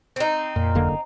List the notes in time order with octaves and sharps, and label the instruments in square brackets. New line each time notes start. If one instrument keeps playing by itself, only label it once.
[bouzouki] C4 D#4
[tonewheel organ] F2 [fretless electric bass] A#2
[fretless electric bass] F#1 D3 A#3